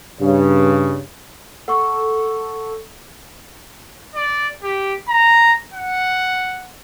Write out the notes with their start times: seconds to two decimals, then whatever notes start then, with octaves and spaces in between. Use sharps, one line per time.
0.21 G2 C#3
1.68 A4 F#5 C#6
4.15 D5
4.63 G4
5.09 A#5
5.74 F#5